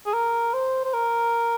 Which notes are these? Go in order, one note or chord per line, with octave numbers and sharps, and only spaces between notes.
G#4
A#4
C5
C5
A#4